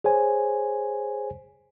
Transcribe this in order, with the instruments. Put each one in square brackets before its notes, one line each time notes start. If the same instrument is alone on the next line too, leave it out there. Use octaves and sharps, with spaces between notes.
[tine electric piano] G#4 C5 C#5 G#5